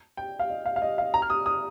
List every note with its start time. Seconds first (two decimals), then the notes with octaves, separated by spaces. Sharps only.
0.17 G5
0.39 F5
0.50 D#5
0.66 F5
0.76 F5
0.82 D#5
0.98 F5
1.14 A#5
1.22 F6
1.30 D#6
1.46 D#6